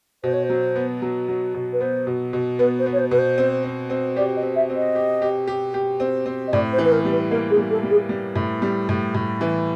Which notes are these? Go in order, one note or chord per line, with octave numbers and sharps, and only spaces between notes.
B2 C5
C#5
C5
F#3
B3
F#3
F#3
B2
B4
B3 C5
B2
B2
B3 B4
C5
B3
C#5
C5
B2 B4
C5
C4
C4
C4
G4 D5
D#5
C4
E5
C4
D#5
G4
G4
G4
G4
C4
C4
D#5
A2 D5
C5
E3
B4
A#4
G3
B4
A#3 A#4
G#4
G3
A4
G3
G#4
G3
A2
G3
A2
A2
E3